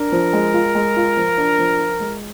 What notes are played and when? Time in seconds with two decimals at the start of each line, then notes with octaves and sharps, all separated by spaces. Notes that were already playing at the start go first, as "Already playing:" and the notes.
Already playing: D4 A#4
0.12 F3
0.33 G#3
0.54 F4
0.75 G#3
0.97 F4
1.17 F3
1.38 D4
1.59 F3
1.80 F4
2.00 G#3